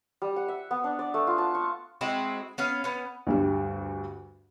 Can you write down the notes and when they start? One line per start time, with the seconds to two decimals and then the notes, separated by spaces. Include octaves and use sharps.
0.22 G3
0.36 F#5
0.48 E5
0.71 B3
0.84 D4
0.99 D5
1.14 A3
1.27 F4
1.38 A5
1.55 C#6
2.01 G#3 C4 E4 F#4
2.58 B3 C#4 F5
2.84 B3 C#4
3.27 D2 G2 G3